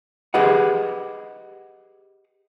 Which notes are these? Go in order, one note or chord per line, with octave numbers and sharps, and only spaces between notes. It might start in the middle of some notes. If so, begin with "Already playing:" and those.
G4 G#4 B4 D#5 F#5